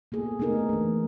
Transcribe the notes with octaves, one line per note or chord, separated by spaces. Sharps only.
A#3 B3 G#4 A4
A3 B3 D4 D#4 G#4 A#4
E3 A3